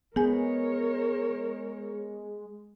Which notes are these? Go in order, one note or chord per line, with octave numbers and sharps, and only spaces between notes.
G#3 B3 G#4 A#4 C#5 G#5